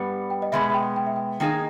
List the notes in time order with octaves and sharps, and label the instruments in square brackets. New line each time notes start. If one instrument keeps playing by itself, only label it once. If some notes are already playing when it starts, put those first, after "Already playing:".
Already playing: [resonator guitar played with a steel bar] G2 G3 B3 [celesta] B5
[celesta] G5
D#5
[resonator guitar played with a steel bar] B2 G#3 B3 [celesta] E5
[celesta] E5
G5
G5
E5
G5
[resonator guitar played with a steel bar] D#3 A#3 D#4 G#4 [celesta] G5